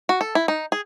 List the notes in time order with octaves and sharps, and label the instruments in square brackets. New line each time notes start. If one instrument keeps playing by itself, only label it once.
[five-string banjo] F#4
A4
E4
D#4
G#4